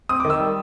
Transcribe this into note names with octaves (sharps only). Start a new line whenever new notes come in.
C4 D#6
D#3 D6
E6
G3